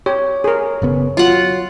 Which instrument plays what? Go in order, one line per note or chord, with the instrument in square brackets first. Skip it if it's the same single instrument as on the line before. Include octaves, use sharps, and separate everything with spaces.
[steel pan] G4 [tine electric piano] C#5
[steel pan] G#4 A#4
[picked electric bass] F#1 C#3 B3
[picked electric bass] F#3 [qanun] F4 F#5